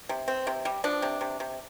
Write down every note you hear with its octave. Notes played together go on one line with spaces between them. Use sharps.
C3
C4
C3
G3
F3 D4
C3
C3
C3